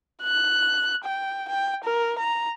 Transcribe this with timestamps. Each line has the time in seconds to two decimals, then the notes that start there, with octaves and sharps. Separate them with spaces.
0.22 F#6
1.04 G5
1.49 G5
1.84 A#4
2.18 A#5